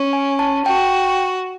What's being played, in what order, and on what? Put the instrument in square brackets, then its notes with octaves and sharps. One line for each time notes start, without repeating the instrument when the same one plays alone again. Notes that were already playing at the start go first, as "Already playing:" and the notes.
Already playing: [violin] C#4
[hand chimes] G#5
A5
[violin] F#4 [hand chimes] G5